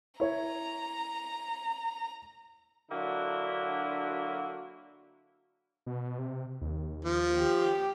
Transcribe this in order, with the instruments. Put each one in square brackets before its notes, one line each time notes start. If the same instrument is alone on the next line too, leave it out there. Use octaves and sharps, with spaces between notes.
[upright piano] E4 C#5 [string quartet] A#5
[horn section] D3 F#3 A#3 D4 E4 F#4
[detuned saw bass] B2
C3
D#2
[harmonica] F3
[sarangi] G4